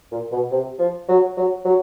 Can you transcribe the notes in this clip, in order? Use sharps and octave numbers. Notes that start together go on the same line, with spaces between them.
A#2
B2
C3
F3
F#3
F#3
F#3